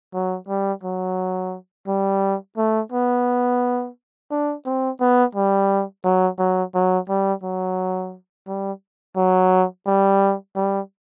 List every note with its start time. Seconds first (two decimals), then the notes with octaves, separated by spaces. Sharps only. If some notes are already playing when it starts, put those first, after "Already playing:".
0.14 F#3
0.48 G3
0.83 F#3
1.87 G3
2.57 A3
2.92 B3
4.31 D4
4.66 C4
5.00 B3
5.35 G3
6.05 F#3
6.39 F#3
6.74 F#3
7.09 G3
7.43 F#3
8.47 G3
9.16 F#3
9.86 G3
10.56 G3